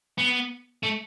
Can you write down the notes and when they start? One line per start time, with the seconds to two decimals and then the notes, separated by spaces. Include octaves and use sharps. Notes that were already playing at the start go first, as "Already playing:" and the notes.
0.18 B3
0.83 A3